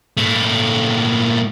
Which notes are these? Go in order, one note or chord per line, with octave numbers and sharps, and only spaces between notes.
A#2 A3